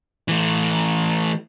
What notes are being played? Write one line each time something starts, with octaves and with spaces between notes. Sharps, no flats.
E3 A3